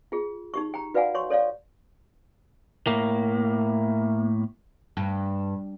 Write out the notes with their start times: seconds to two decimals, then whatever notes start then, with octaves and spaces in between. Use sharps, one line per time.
0.12 F4 G#4
0.54 D#4 G4 C#6
0.74 G5 A#5
0.94 F#4 B4 D5 F5 F#5 G#5
1.15 C#5 C6 C#6
1.30 A4 C#5 D5 F5
2.87 A2 A#3
4.97 G2